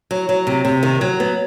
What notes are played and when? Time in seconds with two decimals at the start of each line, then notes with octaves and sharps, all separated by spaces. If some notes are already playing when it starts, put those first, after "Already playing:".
0.11 F#3
0.29 F#3
0.47 C3
0.65 C3
0.83 D#3
1.01 F#3
1.20 B3